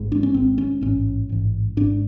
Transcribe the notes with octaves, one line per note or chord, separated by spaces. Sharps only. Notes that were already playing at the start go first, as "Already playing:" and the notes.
Already playing: G#1 G#2
D4
C#4
G#1 G#2 C4
C#4
A1 G#2 C#4
A1 G#2
G#1 G#2 D4